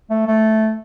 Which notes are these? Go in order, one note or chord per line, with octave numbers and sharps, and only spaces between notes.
A3
A3